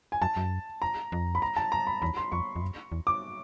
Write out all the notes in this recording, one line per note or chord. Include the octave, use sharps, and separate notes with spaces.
G#5
F#2 A5
F#2
A#5
F2
B5
A#5
A5
A#5
B5
E2 B5
C6
F2 C#6
F2
F#2
E2
D6